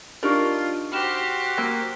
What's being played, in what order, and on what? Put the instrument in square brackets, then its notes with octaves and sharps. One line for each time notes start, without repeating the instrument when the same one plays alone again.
[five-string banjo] D4 D#4 A#4 [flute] F4 [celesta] G4 D5 C#6
[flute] F#4 [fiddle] G4 C5 [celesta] B5 F6 E7
[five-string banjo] A#3 [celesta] E6 F6